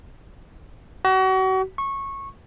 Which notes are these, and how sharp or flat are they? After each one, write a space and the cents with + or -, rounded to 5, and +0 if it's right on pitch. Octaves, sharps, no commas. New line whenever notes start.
F#4 +35
C#6 -15